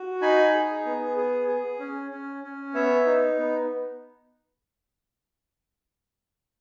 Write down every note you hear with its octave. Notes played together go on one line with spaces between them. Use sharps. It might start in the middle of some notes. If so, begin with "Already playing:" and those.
Already playing: F#4
D#4 G#5 B5
G#4
B3
G#4
G#4
C#4
C#4
C#4
B3 C#5 E5
D#4
B3